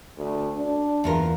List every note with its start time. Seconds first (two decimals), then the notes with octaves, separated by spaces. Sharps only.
0.17 D2
0.57 D4
1.04 E2 F4 A#4